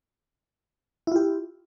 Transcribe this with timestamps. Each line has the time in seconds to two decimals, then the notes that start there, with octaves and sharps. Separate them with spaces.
1.07 E4
1.12 F4
1.16 G4